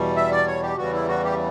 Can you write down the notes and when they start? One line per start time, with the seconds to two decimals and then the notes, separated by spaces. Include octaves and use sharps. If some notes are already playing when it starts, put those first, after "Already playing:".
Already playing: E2 B2 G3
0.16 E5
0.32 D5
0.47 C#5
0.62 G4
0.78 E2 C#3 E3 G3 F#4
0.93 E4
1.08 F#4
1.24 G4